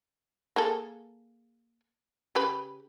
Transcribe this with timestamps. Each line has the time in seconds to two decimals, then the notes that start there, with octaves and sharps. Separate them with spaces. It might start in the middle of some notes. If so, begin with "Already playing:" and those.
0.56 A#3 G#4 A4
2.35 C#3 G4 B4